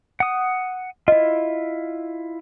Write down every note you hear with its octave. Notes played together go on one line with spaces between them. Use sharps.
F#5 D#6
E4 F4 D#5